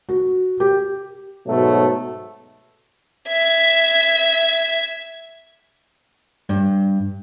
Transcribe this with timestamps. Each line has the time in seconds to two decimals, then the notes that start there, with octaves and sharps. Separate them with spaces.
0.09 F#4
0.60 G4
1.47 G#2 B2 F#3 A3
3.29 E5 G#6
6.49 G2